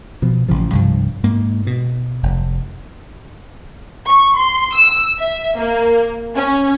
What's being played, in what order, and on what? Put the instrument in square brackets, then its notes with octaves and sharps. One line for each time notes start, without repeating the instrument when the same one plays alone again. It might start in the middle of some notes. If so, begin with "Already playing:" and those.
[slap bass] B2 F3
A1 C#3 F3
C2 G2 F3
G#2 A#3
B2
F1
[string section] C#6
C6
E6
E5
A#3
C#4